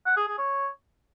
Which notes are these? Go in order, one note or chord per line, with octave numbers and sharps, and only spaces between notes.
F#5
G#4
G#4
C#5